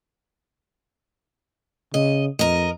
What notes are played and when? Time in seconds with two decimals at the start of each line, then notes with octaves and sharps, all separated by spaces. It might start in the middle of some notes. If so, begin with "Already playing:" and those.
1.94 C#3 D#5
2.39 F2 A#4 D#5